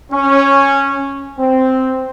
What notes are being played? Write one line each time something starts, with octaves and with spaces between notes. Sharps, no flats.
C#4
C4